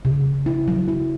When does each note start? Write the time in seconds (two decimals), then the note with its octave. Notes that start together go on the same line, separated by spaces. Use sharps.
0.05 C#3
0.26 C#3
0.46 E4
0.68 F#3
0.88 E4